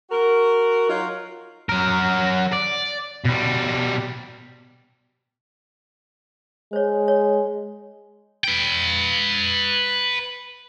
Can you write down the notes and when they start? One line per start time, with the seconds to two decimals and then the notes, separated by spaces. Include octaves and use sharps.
0.11 F#4 A#4
0.88 F#3 D#4 F4
1.69 F#3 A#4
2.52 D5
3.25 B2 G3
6.73 G#3 C5 C#5
7.08 C#5
8.44 B4 G5